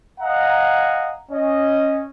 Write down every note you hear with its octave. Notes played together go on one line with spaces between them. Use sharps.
D#5 F5 F#5 G#5 A#5
C#4 D#5